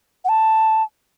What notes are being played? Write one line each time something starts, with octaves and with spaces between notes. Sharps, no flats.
F#5
A5